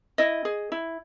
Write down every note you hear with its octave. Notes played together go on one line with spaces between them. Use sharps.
E4 D#5
G#4
E4